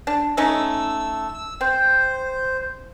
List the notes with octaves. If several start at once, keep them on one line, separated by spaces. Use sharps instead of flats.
D4
A3 C#4 D#4 E6
C4 C5